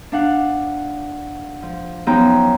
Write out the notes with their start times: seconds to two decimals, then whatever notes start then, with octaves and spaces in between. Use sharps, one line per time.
0.12 D4 F5 F#5
1.62 F3
2.07 F#2 F3 B3 D#4 G5 A#5